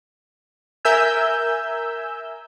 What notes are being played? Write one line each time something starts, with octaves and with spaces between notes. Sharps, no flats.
A#4 E5 G#5 E6 G6